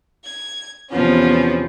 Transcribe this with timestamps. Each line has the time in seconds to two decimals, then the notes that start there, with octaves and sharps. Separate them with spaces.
0.23 G#6
0.90 E2 C3 F3 B3 C#4